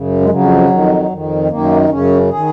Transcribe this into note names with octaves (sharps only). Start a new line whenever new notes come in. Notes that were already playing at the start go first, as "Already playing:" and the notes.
Already playing: F#2 C#3
G#3
F2 C#3 F#3
F2 D#3
F2 D#3
F#2 D#3 A#3
F#2 C#3 C#4
D#3 G#4